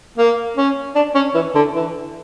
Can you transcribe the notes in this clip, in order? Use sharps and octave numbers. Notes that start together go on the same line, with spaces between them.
A#3
C#4
D4
C#4
E3
D3
E3